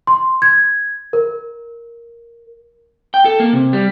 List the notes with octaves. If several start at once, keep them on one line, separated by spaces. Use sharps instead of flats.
C6
G#6
A#4
G5
A4
A#3
C3
G3